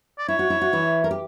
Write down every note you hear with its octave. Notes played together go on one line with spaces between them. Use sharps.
D5
E4 C#5
F#4
E4
F#4
E3 E4
A#4
G4